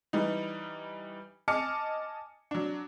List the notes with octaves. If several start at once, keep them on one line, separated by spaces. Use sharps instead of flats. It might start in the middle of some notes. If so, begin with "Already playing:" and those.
E3 G3 D#4
D#5 G#5 A5 D6 F6 C#7
F#3 D4